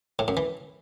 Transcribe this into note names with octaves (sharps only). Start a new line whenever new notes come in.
A2
F#2
E3